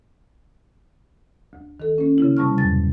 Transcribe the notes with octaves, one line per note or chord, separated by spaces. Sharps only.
D2
D#3 A4
A#3 C#4
C#3 E4
C3 G3 A5 C#6 F6
E2 G2 B2 F#3 A6